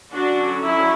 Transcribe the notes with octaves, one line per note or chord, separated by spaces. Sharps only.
D3 F#3 C#4 D4 F#4
E4